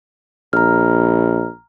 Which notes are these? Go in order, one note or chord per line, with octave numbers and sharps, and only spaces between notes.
A#1 A#5 F6